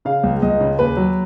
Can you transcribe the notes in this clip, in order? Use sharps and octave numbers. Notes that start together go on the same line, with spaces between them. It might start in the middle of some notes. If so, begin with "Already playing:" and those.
C#3 F5
C#2
C#2 D#5
C#3
D#2 B4
F#3